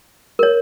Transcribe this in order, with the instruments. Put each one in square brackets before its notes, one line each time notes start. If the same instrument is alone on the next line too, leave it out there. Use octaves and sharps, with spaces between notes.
[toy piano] A#4 C#5